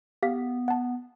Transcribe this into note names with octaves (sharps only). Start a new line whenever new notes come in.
B3 G4 F5 B6
F#5 A5